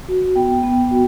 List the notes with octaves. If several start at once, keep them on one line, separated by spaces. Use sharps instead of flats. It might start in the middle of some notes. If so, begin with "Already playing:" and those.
F#4
B3 G5
B3
F#4